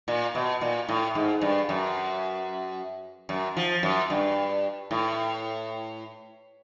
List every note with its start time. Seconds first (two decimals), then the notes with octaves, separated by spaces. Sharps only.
0.08 A#2
0.35 B2
0.61 A#2
0.89 A2
1.15 G#2
1.42 G2
1.69 F#2
3.29 F#2
3.57 F3
3.83 F#2
4.10 G2
4.91 A2